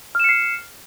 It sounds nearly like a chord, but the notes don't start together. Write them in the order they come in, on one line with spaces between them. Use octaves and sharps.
F6 E7 C#7 C7